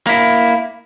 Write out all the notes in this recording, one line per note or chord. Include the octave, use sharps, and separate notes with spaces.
A#3 E4